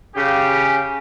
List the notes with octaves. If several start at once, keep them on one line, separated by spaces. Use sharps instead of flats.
C#3 G4